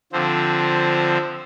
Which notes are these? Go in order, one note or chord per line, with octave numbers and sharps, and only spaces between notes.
D3 F3 C4